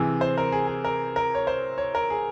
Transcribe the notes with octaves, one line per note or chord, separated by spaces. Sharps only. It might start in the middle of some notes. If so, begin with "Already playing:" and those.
Already playing: C3 E3 G#4
C5
A#4
G#4
G#4
A#4
A#4
C#5
C5
C#5
A#4
G#4